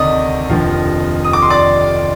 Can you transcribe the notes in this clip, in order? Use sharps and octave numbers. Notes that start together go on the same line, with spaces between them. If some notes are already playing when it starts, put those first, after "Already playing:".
Already playing: D2 C3 D#3 D5 D#5 D#6
F1 D#2 D3 F3
D#6
D6
C6
D5 D6